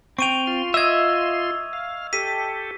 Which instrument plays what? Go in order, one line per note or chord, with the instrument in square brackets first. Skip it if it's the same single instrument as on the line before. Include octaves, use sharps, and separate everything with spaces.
[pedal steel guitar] C4 G5 [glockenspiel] C#6 D#7 F7
[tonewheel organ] F4 C6
[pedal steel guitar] D#5 E5 [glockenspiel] E6 G#6
[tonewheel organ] F5
[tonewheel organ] G4 A4 [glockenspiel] B6 D#7